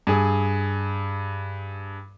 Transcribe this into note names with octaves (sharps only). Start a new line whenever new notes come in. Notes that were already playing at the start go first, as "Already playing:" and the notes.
G2 G#4